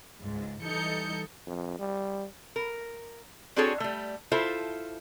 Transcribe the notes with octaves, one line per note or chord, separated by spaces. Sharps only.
C#2 G#2
E3 G3 D#4 A4 G6 C#7
F2
G3
A#4
C4 D4 F#4 G#4 A4 C#5
G3 A3
E4 F4 A4 C5 E5